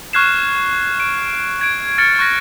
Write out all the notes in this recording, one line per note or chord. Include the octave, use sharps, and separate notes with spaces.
C#6 F6 F#6 G#6 C7 E7
D7
G#6 D7
F6 A6 C#7 D7
C#6 F#6 A#6